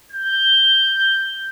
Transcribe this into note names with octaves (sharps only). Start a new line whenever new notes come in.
G6